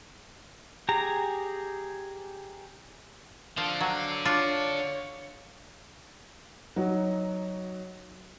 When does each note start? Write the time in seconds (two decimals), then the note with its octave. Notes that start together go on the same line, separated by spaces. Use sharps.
0.89 G4 G#4 A#5
3.58 D3 F3 F5
3.81 F#3
4.25 D4 F4 C#5
6.76 F#3 D#4 F#4